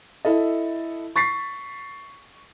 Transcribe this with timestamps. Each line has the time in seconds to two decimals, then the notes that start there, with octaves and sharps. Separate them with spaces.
0.25 E4 A4 D#5
1.16 C#6 A6 B6 C7